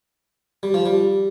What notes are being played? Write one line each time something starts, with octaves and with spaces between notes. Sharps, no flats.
G3
F3
G3